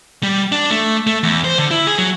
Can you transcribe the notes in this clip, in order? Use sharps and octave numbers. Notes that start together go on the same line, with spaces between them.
G3
D4
A3
A3
E2
C5
D3
E4
G#4
F#3